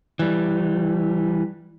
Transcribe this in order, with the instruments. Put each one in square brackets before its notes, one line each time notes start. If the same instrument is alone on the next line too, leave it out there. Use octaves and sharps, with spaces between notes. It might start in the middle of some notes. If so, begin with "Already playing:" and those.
[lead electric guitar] E3 G3